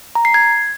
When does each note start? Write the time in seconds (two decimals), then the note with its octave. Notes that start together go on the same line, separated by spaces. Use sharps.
0.15 A#5
0.25 C7
0.34 G#6